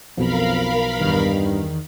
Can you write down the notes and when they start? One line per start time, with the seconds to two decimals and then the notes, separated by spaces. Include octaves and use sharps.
0.18 B1 F2 B2 F3 A#4 F5 B5
1.00 E2 G2 D#3